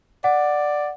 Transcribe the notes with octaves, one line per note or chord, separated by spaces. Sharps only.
D5 F#5